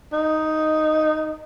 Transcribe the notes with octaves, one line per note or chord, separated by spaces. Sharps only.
D#4